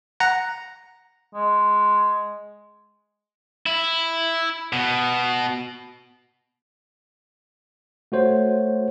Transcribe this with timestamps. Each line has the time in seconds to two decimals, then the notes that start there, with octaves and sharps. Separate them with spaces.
0.20 F#5 A#5
1.35 G#3
3.66 E4
4.73 B2
8.12 A3 F#4 C5 C#5